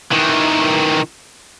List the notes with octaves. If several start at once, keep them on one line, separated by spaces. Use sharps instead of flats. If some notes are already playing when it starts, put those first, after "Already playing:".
D#3 E3